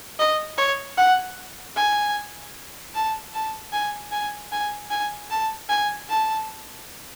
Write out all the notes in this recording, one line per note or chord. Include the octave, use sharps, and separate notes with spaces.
D#5
C#5
F#5
G#5
A5
A5
G#5
G#5
G#5
G#5
A5
G#5
A5